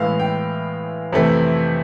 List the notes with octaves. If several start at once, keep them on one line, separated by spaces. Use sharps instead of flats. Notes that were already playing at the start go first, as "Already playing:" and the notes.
Already playing: A2 E3 G#3 B3 F5
G5
F2 C3 E3 A3